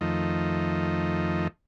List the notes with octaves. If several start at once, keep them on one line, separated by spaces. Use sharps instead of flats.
F2 D#3 F3 A3 D#4